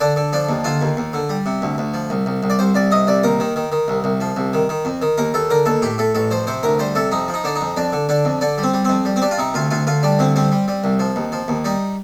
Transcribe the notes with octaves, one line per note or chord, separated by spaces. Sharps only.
D3 D4
D3
F3 D4
D#2
D3 F4
D#2
D#2
D3
G3
C3
D2
D2
F3
C2
C2
C2
D5
C2 C5
C2 D5
C3 D#5
C2 D5
D#2 A#4
D#3
D#3
D#3
C2
C2
F3
C2
D#3
D#3
F2
D#3
D#2 A#4
D#2 A4
D3 A#4
D#2 A4
A2 G4
A2 A4
A1 A4
F3 C5
C3 C5
D2 A#4
G3 C5
C3 A4
F2 D#4
F3
D#4
D3 D4
D#4
F2
F2 D4
D3
D3 D4
F2
D3 D4
G3
C4
G3
F2 C4
G3
C4
G3 D4
F4
C3 D#4
D2 F4
D2 F4
D2 F4
G3 D4
D2 C4
G3 C4
G3
G3
C2
F3
D#2
F3
D#2
G3 D#4